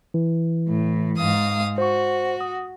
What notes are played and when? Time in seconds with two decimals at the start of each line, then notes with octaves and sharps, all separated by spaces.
0.14 E3
0.68 A2
1.17 G#2 F5 D#6
1.78 F#4 C5 C#6
2.41 D#6